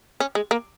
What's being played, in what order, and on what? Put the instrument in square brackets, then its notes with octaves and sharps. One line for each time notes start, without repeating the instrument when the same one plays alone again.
[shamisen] C#4
G#3
A#3